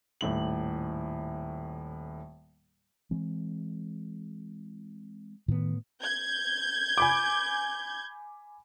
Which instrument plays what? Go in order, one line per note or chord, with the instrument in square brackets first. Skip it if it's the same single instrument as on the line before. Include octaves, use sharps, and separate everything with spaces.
[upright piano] D#1 A2 F#7
[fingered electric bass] E3 G#3 C4
[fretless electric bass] A2 B3 [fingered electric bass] D#3
[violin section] G6 G#6
[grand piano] G#5 B5 D6